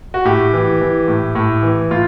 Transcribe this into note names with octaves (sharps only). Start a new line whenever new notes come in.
F#4
A2 G4
E3
E3
A2
A2
E3
A2 F4